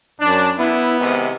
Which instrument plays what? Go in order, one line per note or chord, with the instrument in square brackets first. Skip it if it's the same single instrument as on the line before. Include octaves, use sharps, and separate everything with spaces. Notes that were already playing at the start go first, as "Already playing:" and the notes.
[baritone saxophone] F#2 [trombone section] D4
[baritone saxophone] B3 [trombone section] E4
[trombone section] G#2 C3 D#3